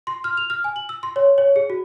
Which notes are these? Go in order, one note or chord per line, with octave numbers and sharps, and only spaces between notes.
C6
F6
F7
F6
G#5
F#7
E6
C6
C#5
C#5
G#4
F#4